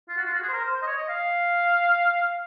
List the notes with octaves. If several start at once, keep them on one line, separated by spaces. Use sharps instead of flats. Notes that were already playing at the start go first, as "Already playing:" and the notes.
F4
F#4
F4
F#4
G#4
C5
A#4
C5
C5
D#5
C#5
D#5
F5